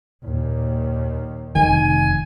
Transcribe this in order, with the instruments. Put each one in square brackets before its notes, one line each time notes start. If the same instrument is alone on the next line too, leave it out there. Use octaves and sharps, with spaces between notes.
[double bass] D#2 A#2
[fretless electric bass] F1 D#3 [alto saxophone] G#5